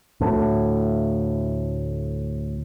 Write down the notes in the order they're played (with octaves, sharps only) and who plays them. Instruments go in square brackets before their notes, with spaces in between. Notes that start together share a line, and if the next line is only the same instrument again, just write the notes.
[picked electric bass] D2 A2